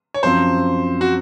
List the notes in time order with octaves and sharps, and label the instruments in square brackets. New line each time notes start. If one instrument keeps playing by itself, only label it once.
[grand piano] C#5
[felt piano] F#2 F3 C4 [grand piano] C5
[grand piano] F#4